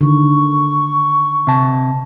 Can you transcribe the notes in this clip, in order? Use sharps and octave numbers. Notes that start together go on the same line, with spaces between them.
D3 D#3 C#6
C3 A5